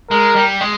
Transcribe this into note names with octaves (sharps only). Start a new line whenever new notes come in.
G#3 A#4
G3
G#3